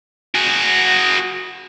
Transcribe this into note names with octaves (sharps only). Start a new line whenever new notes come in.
F#4 G#4